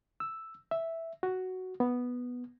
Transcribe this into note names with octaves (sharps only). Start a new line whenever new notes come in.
E6
E5
F#4
B3